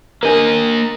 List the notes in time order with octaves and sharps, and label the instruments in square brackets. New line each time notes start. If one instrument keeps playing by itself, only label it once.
[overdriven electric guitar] A#3 D#5 [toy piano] D4 A#4